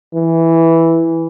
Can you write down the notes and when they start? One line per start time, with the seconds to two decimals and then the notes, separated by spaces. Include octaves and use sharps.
0.15 E3